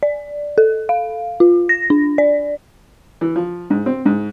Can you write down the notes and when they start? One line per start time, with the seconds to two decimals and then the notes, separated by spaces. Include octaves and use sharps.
0.03 D5
0.58 A4
0.89 F5
1.40 F4
1.69 A#6
1.90 D4
2.18 D5
3.21 E3
3.36 F3
3.70 G#2
3.86 C4
4.05 G#2